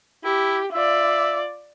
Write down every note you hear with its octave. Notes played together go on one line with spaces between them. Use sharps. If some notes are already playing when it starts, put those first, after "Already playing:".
E4 G4
F4 D5 E5